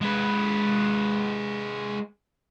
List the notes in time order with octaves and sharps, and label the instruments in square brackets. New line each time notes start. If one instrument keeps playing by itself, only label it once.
[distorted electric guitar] G#3 B4